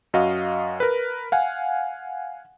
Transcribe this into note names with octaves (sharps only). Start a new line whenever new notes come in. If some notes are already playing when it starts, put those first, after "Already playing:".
F#2 F#4 D#5 F5
A#4 B4
F5 F#5 G#5